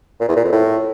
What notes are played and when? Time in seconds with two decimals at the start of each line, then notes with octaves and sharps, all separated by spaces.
0.21 A#2
0.28 E2
0.36 A#2
0.44 F2
0.52 A2